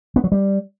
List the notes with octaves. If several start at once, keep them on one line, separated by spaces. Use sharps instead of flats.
B3
F#3
G3